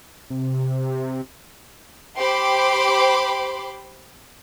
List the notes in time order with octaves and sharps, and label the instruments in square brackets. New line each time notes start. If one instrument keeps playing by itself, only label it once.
[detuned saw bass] C3
[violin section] G4 C5 B5 C6 D6